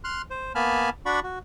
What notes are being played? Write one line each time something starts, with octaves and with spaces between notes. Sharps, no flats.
C6 F6 F#6
C5
A#3 B3 G#5 A5 B5 F6
D4 F#4 D5 F#5 B5 C#6
F#4